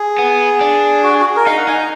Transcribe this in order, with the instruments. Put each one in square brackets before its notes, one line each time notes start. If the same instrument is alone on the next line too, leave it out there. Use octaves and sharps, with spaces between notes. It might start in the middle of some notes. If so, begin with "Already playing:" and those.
Already playing: [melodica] G#4
[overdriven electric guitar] B3
D4
[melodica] F#4
G#4
F#4
G#4
A#4
[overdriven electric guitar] D#4 [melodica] F5
[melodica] F#5
[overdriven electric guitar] D#4 [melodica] G#5
[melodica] A#5